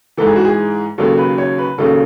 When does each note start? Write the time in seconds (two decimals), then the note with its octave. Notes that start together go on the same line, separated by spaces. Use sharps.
0.17 G#2 E3 A4
0.27 G#4
0.36 F#4
0.45 G#4
0.98 D#2 C#3 F#3 A4
1.18 B4
1.38 C#5
1.58 B4
1.78 D#2 C#3 F#3 A4